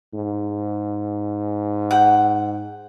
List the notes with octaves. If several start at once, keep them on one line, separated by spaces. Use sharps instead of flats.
G#2
F#5 G5